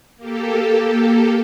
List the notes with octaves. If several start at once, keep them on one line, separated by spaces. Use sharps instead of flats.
A#3 G4 A4